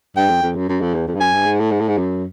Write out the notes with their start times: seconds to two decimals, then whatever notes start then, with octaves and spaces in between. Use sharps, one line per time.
0.17 G2 G5
0.30 F2
0.43 F2
0.56 F#2
0.69 F#2
0.81 F2
0.94 E2
1.07 F2
1.15 G2
1.20 F#2 G#5
1.33 G2
1.46 G#2
1.59 A2
1.71 G#2
1.80 A2
1.88 G#2
1.98 F#2